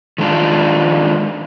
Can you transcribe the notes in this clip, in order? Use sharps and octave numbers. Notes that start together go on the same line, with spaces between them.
D#3 G#3 D4 F4